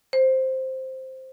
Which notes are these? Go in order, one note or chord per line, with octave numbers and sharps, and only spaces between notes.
C5